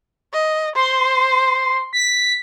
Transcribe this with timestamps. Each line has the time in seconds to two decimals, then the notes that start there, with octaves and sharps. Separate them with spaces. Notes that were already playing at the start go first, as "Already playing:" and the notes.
0.33 D#5
0.76 C5 C6
1.93 B6